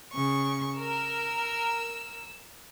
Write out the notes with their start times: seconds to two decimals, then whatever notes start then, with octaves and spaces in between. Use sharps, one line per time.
0.12 C#3 C#6
0.77 A#4 E6